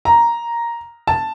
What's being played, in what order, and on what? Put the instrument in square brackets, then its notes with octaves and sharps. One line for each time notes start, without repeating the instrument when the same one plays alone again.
[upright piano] A#5
A5